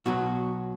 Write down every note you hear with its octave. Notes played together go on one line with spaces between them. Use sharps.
B1 B2 F#3 F#4